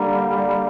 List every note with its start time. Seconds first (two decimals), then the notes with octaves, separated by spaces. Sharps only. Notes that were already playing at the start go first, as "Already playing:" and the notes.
Already playing: D3 G3 A#3